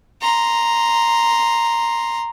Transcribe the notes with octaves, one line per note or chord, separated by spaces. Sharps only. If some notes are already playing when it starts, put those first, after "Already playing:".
A#5 C6